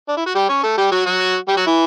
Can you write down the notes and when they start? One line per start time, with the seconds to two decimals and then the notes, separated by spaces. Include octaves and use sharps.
0.09 D4
0.17 E4
0.26 F#4
0.35 G3 G4
0.49 C#4 C#5
0.63 A3 A4
0.78 G3 G4
0.91 F#3 F#4
1.06 F#3 F#4
1.48 G3 G4
1.57 F#3 F#4
1.67 E3 E4